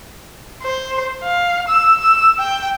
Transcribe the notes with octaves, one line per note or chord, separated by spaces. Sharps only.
C5
F5
E6
E6
G5